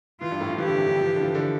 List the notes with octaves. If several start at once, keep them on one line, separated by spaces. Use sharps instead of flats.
E3 F4
G2
A2
F3
E3 G4
D3
C3
D3
F3
E3
D3
F3
E3
D3